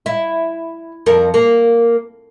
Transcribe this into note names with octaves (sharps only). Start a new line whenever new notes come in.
E4
F2 A#4
A#3